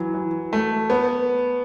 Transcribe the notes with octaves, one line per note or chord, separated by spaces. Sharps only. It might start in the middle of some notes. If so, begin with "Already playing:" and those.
Already playing: E3 F#3
E3
A3
B3